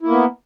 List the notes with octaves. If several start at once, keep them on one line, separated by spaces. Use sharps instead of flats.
A#3 B3 E4